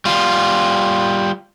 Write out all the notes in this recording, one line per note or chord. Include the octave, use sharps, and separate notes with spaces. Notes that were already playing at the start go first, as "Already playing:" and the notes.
G3 F4